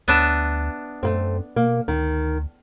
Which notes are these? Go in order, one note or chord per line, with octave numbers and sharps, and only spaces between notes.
D2 B3 D4 E5
F#2 A3 A#3 C4
B2 A#3
D2 D#3